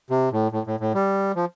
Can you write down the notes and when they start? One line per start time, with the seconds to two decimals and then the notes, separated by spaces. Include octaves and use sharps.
0.10 C3
0.32 A2
0.52 A2
0.67 A2
0.80 A2
0.94 G3
1.36 F3